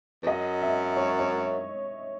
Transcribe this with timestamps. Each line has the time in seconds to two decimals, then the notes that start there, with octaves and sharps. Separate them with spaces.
0.23 E2
0.27 F#2 D#5
0.62 E5
0.97 C#5
1.19 C#5